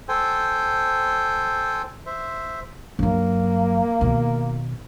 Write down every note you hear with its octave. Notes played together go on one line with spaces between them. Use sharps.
A4 C5 G5 G#5
C5 E5
G2 F#3 A#3
B2 D#3